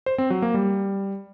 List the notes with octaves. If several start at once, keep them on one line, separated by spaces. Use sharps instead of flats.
C5
C4
F#3
A#3
G3